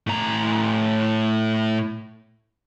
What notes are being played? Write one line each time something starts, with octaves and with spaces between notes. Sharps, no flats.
A2 A#5